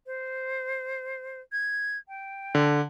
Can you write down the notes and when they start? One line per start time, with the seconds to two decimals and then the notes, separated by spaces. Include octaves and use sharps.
0.06 C5
1.52 G#6
2.08 G5
2.55 D3